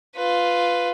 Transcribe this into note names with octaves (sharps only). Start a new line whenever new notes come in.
F4 B4